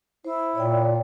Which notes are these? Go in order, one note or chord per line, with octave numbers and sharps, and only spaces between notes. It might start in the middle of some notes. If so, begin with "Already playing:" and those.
E4 C5
A#2 C#5 D5 G5